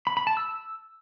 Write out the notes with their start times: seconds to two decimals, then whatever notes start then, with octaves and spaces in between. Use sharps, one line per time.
0.07 B5
0.17 B5
0.27 A5
0.37 E6